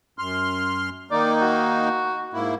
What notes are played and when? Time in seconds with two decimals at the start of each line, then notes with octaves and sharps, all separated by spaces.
0.19 F#2 C6 F6
1.11 D#3 A#3 D#4 D5
1.42 F#4
2.33 G#2 A#3 E4